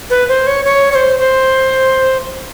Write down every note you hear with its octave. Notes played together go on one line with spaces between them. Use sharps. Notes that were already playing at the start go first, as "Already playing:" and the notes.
B4
C5
C#5
C#5
C#5
C5
C5